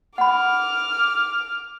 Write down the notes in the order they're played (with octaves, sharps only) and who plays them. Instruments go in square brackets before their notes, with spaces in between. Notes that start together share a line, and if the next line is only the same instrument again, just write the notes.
[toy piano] F#5 B5 [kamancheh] D6 F6